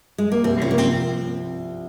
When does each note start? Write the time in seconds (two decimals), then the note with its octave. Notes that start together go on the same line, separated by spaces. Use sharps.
0.18 G#3
0.32 A#3
0.44 C2 C4
0.61 C3 F3 C#4
0.71 A#3
0.78 C4